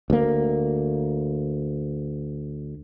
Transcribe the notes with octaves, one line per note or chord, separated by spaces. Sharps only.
D2 A#3